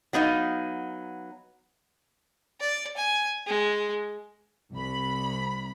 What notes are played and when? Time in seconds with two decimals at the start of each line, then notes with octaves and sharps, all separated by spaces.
0.13 F#3 B3 D#4 F5
2.61 D5
2.97 G#5
3.47 G#3
4.73 C2 B5